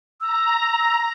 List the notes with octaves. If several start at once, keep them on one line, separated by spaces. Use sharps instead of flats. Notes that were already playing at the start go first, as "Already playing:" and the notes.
A#5 E6